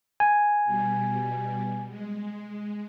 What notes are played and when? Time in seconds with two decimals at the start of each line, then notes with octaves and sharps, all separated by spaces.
0.20 G#5
0.65 B2 G3
1.88 G#3